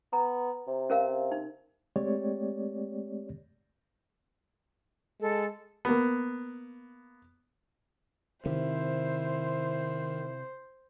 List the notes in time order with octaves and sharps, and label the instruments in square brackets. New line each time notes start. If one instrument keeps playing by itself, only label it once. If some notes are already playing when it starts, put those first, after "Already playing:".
[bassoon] B3 [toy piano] A#5
[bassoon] C3
[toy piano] C#4 A#4 F5
D#4
[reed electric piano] G#3 A3 C4 G4 C#5 D5
[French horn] G#3 [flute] A4
[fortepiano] A#3 B3
[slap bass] C3 [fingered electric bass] D#3 [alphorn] E4 [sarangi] C5